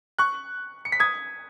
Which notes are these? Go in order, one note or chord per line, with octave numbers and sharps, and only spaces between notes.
C#6 F#6
C#7
B6
D#6 G#6